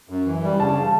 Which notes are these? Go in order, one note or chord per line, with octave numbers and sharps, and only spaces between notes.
F#2
E3
G3
C#3 A5